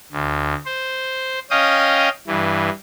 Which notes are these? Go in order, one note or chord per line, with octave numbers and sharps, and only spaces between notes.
D2
C5
C#4 D#5 F5 G5 D#6
G2 E3